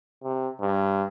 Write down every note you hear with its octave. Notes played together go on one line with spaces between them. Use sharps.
C3
G2